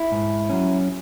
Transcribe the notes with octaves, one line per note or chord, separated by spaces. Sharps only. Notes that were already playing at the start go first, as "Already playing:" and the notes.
Already playing: E4
G#2
F#3 C#4